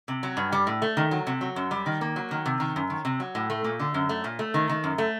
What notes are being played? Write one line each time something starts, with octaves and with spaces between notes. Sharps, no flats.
C3
F#3
G2
G3
A2
A3
D#3
F#3
C3
F#3
F#2
G3
D#3
A#3
F#3
D#3
C3
D#3
F#2
D#3
C3
F#3
A2
A3
A#2
D3
F#2
A3
A#2
A3
D#3
D#3
F#2
A3